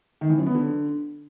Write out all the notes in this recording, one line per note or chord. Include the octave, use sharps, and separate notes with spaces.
D#3
E3
F#2
B3
D3